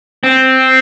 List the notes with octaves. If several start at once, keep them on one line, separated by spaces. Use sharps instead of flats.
C4